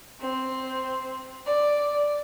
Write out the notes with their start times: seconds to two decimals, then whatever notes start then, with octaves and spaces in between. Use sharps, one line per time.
0.21 C4
1.45 D5